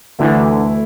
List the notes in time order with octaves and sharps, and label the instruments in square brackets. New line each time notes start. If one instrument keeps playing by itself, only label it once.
[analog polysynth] D2 D3 [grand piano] E3 A3 E4